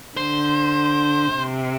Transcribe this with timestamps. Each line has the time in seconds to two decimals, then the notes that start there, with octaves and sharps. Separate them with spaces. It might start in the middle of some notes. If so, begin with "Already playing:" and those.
0.17 D3 C5
1.36 C3